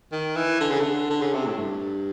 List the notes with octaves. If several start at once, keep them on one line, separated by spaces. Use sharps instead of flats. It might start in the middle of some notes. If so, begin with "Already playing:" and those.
D#3
E3
D3
C#3
D3
D3
C#3
C3
A2
G2